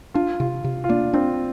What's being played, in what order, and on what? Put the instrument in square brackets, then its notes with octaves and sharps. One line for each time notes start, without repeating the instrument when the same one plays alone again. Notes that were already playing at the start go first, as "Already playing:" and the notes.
[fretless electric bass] D4 [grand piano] F4
[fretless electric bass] C3 [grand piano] F4
[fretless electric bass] C3
[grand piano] F4
[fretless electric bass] A#3 [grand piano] D4
[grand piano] C4 [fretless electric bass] D4